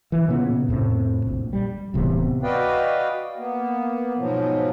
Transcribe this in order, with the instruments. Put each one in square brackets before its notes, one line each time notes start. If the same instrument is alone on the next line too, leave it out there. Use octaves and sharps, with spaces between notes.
[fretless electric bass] E3
A#2 C#3 B3
F2 A2 C3
A#1
G3
D1 C3 E3 B3
[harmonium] F#4 B4 D5 D#5 F5 G5
A#3 B3
G#2 B2 F3 F#3